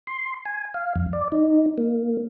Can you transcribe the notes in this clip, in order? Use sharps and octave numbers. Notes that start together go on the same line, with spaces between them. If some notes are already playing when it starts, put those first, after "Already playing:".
C6
G#5
F5
F2
D5
D#4
A#3